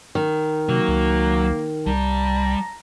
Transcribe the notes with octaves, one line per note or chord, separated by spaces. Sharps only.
D#3
C3 F#3 A#3
C#2
C2 G3 A5 A#5